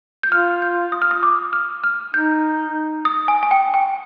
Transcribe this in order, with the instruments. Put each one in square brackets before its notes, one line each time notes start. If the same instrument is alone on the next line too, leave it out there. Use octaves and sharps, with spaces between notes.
[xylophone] G6
[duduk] F4 [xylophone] F6
[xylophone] G6
D#6
F6
D#6
D6
F6
F6
[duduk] D#4 [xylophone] G6
[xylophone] D#6
G#5
G#5
G5
G5